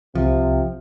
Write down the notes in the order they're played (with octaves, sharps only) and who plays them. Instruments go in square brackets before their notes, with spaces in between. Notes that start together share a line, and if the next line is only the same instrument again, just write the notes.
[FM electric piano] C2 [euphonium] C3 [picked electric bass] F3